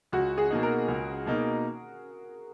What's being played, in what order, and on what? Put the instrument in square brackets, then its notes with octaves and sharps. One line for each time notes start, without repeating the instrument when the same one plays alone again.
[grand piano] C#2 [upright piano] F#4
[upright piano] G#4
[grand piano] B2 A#3 D#4
[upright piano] A#4
[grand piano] C#2
B2 A#3 D#4